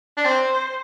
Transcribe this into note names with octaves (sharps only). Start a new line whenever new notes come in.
D4
C4 C5